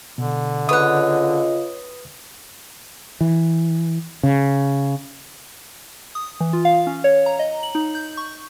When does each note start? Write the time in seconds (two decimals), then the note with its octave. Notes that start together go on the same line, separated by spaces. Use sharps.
0.18 B2 D3
0.69 C#3 F4 B4 C#5 D#5 F#5 D#6
3.21 E3
4.23 C#3
6.15 D#6
6.40 E3
6.53 F4
6.65 F5
6.87 C#4
7.04 C#5
7.26 A#5
7.39 D#5
7.63 F#7
7.75 D#4
7.95 G6
8.17 C#6